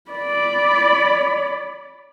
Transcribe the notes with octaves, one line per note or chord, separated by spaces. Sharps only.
D5 B5